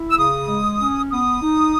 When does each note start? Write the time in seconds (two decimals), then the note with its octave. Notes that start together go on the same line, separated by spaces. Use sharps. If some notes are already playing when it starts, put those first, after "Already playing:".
Already playing: E4
0.11 E6
0.18 C#3 D#6
0.48 G#3
0.80 C#4
1.10 B3 D#6
1.42 D#4